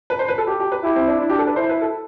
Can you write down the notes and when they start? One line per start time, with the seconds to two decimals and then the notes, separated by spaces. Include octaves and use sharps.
0.10 B4
0.19 C5
0.28 B4
0.38 A4
0.47 G4
0.60 G4
0.72 B4
0.83 E4 G4
0.96 C4
1.08 D4
1.20 D4 E4
1.30 G4
1.39 A4
1.47 B4
1.56 E4 C5
1.69 B4
1.82 A4